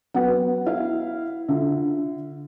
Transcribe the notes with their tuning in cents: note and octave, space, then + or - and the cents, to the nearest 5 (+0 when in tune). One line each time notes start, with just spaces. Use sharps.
F#3 +0 B3 +0 F#5 +0
E4 +0 F5 -15
D3 -15 F4 +0 E5 +0